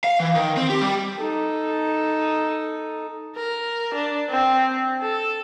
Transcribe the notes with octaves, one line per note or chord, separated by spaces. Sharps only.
F5
E3
D#3
C4
G4
G3
D#4 A4
A#4
D4
C4
A4